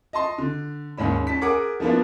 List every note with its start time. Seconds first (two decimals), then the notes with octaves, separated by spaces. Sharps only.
0.13 D#5 A5 C6
0.38 D3
0.97 D#2 G#2 C#4 B5
1.27 C#4 A5 B6
1.42 G#4 A#4 F#5 D6
1.80 F3 A#3 B3 D4 F4